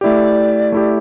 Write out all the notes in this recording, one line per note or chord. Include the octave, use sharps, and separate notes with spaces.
A3 E4 G4 D5
A3 E4 G4